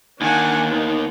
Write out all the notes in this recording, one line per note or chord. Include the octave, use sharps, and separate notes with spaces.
D#2 D#3 D4 F#5 G#5
B3